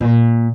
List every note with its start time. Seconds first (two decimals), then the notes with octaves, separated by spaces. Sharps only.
0.01 A#2